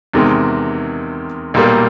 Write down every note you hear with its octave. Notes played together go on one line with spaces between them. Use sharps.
E2 C3 D#3 G#3
B1 A#2 G3 A#3